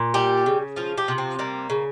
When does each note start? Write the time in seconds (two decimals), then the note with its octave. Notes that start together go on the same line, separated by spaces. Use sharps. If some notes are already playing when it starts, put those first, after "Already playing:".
Already playing: A#2
0.14 G3 G4
0.46 C#3
0.76 F3 F4
0.98 G4
1.08 C3
1.18 C4
1.39 G3 A#3
1.70 C#3